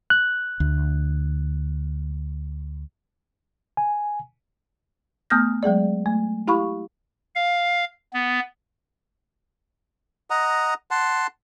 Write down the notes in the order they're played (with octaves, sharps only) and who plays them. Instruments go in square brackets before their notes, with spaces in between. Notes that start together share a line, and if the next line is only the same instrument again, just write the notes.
[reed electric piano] F#6
[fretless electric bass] D2
[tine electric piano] G#5
[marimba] A3 B3 D#6 F6 G6 A#6
F#3 G#3 G#4 D5
A3
E4 G4 F5 B5 C#6
[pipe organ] F5
B3
[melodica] D#5 F#5 A#5
F#5 A5 C6